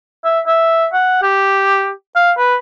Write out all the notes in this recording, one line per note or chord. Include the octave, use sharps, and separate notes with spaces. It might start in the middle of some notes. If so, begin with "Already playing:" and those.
E5
E5
F#5
G4
F5
B4